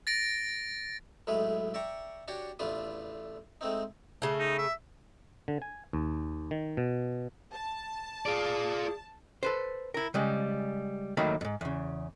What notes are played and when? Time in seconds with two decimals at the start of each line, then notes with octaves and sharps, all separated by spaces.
0.07 A6 A#6 D7
1.27 B1 A2 G#3 A3 B4
1.74 D5 E5 G5 A#5 C#6
2.28 D4 F#4 G4 C#5 D5
2.59 A1 E2 A3 D4 F4 B4
3.61 G#3 A3 C4 D#4
4.22 C#3 A3
4.39 D#4
4.58 E5
5.48 D3
5.62 G#5
5.93 D#2
6.51 D#3
6.77 B2
7.52 A5
8.26 F4 G#4 D5
9.43 A4 B4 C5
9.94 E4 A#4
10.14 C#3 G3 G#3
11.17 D#2 D#3 F#3 A3 A#3 B5
11.41 F2 G#2
11.61 E2 C#3